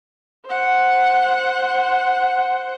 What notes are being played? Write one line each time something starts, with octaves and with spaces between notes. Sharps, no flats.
C5 F#5